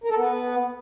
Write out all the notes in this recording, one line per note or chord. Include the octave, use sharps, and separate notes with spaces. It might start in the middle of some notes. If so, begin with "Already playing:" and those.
A#4
A4
B3